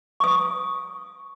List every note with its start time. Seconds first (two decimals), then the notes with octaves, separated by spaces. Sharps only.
0.20 C#6 D#6